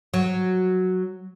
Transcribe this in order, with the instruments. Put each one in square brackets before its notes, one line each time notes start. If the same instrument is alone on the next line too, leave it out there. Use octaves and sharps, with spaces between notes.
[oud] F#3